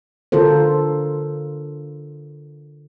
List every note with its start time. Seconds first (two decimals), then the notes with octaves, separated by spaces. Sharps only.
0.32 D3 F4 A4 A#4 C5